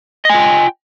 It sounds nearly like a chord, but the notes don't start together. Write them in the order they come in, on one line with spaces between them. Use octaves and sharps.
D#5 G#5 F4 G5